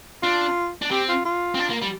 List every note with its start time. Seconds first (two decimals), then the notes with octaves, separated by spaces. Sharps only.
0.23 D4 F4
0.82 D4
0.91 C4 G4
1.09 F4
1.25 F4
1.55 C4
1.59 D4
1.70 A#3
1.82 G3